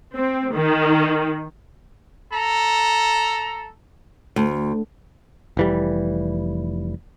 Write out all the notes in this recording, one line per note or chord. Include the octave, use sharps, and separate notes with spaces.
C4
D#3
A4 A#5
D2
F1 E3 G3